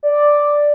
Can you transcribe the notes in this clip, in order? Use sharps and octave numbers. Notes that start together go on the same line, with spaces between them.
D5